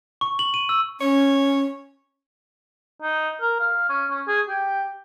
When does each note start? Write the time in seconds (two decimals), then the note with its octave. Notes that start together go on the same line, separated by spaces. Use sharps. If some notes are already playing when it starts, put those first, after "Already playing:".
0.21 C#6
0.39 F#7
0.54 D#7
0.69 E6
1.01 C#4 C#5
3.02 D#4
3.41 A#4
3.60 F5
3.89 C#4
4.10 C#4
4.28 G#4
4.49 G4